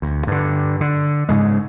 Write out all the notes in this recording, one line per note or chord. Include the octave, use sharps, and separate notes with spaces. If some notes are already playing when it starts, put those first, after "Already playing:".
D2
G2 D3
D3
G#2 C#3 G#3